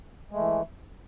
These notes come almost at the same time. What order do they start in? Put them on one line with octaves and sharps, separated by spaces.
G#3 A3 E3